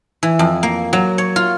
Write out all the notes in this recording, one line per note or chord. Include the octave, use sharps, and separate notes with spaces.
E3
F2
A#3
F#3
C#5
F4